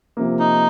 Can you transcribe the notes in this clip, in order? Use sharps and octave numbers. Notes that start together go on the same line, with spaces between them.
C3 F3 A#3
D#4